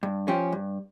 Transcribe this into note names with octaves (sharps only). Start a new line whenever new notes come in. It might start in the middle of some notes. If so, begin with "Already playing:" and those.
G2
F3 C#4 G4
G2